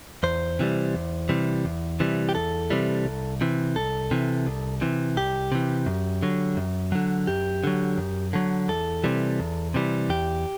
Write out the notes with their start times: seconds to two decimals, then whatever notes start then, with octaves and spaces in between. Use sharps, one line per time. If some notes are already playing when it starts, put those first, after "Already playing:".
0.23 E2 C5
0.59 C3 E3 G3
0.95 E2
1.29 C3 E3 G3
1.65 E2
2.00 C3 E3 G3
2.29 G4
2.35 E2 A4
2.70 C3 E3 G3
3.05 C2
3.41 C3 E3
3.76 C2 A4
4.11 C3 E3
4.46 C2
4.81 C3 E3
5.17 C2 G4
5.52 C3 E3
5.86 F#2
6.22 D3 F#3
6.57 F#2
6.92 D3 F#3
7.27 F#2 G4
7.64 D3 F#3
7.98 F#2
8.33 D3 F#3
8.68 E2 A4
9.04 C3 E3 G3
9.40 E2
9.74 C3 E3 G3
10.09 E2 G4